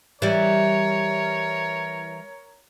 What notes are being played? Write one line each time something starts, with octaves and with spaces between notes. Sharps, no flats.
E3 G3 A#4 C#5